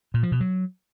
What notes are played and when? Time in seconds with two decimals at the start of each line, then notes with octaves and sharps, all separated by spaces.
0.14 A#2
0.23 F3
0.32 B2
0.40 F#3